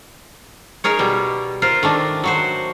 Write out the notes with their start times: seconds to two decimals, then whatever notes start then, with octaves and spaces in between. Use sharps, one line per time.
0.84 D#4 G#4 A#4 C#5
0.99 B2 G3
1.62 F4 A#4 C5
1.83 D#3 A3 D4
2.24 F#3 F#4 C5